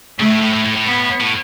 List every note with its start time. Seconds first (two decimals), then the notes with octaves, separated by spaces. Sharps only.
0.19 C#3 A3
0.30 A2
0.42 A2
0.53 A2
0.64 A2
0.76 A2
0.87 B3
1.20 A2